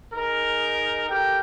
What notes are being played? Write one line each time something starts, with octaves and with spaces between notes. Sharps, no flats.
D#4 G#4 A#4
G4 A4 A#4 G5